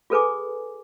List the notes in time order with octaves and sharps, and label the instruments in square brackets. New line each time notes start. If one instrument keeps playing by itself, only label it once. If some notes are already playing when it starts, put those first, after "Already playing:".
[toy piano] F4 G#4 A4 B4 G#5 D6